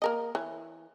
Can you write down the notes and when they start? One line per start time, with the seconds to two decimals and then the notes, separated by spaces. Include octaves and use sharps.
0.02 A#3 A#4 D#5
0.35 E3 C#5